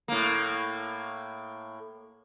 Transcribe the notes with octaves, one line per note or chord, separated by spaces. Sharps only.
A2 A#3